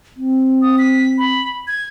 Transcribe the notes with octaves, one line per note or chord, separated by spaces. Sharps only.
C4
D#6
B6
B5
G#6